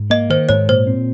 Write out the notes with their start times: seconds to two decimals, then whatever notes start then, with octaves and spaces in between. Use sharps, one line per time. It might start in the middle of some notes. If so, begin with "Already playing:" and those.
Already playing: G#2
0.10 A#3 D#5
0.30 D#3 C5
0.49 G#2 C#5
0.69 A#2 C5
0.87 C4